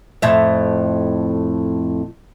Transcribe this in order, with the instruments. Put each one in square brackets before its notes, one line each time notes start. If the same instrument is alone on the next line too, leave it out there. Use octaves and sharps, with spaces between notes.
[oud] F2 A2 E5